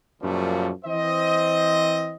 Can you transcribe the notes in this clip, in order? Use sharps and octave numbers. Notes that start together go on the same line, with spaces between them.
F#2 A#2 C#3 F3 G3 A3
E3 C4 C5 D#5